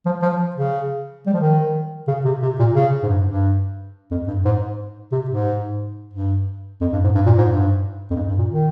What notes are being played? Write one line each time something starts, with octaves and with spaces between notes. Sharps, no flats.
F3
F3
C#3
G3
F3
D#3
C#3
C3
C3
A#2
C#3
G#2
G2
G2
F2
G2
G#2
C3
G#2
G2
F2
G2
G#2
G2
A#2
G#2
G2
F2
G2
G2
A#2
D#3